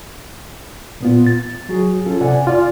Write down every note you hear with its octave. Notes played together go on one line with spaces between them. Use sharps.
A#2 B3 F4
A6
F#3 F#4 G#4
C#4 F4 A4
C3 D5 F#5 G#5
F4 D5